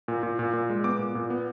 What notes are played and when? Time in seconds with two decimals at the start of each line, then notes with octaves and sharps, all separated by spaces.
0.08 A#2
0.23 A#2
0.39 A#2
0.53 A#2
0.70 G#3
0.84 B3 D6
0.99 A#2
1.15 A#2
1.30 B3